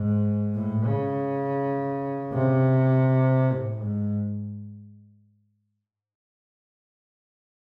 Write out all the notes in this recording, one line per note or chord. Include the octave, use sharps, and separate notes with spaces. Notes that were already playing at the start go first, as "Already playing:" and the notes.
Already playing: G#2
A2
C#3
C3
A2
G#2